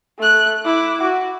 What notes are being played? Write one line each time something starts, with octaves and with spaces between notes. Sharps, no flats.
A3 F#6
E4 D6
F#4